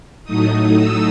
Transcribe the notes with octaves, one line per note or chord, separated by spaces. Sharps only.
A2 F#3 A3 D#4 D#6
E6